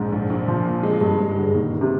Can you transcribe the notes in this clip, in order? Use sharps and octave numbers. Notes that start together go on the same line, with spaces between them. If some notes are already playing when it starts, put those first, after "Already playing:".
Already playing: A#1 G#2 C4
A#1
A#1
A#2 F3
A#2
G#3
G2 G#3
G#3
G2
G1
A#2 D#3
D#3
C3